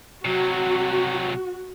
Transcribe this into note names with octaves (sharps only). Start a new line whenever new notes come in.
C3 F#3 F#4